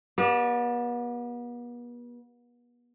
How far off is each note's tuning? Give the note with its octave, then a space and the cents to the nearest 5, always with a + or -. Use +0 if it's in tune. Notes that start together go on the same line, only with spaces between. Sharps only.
B3 -40 G4 +0 D5 +0